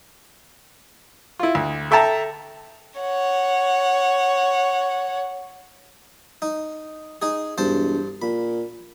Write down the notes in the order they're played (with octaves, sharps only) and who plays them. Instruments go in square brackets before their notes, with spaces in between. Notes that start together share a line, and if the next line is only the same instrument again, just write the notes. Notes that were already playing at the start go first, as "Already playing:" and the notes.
[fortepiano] E4 F4
D2
A4 E5 G5 A5 A#5
[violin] C#5 F#5
[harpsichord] D#4
D#4 G#4
[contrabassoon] E1 [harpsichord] G2 C5 A5
[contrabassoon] A#2 [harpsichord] B5